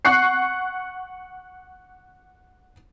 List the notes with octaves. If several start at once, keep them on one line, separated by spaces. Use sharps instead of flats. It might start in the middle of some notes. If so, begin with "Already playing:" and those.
F#5 C#6 F#6 C7